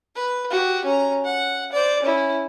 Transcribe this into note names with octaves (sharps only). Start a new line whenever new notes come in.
B4
F#4 G4
C#4 A#5
F#5
C5 D5
C#4 E4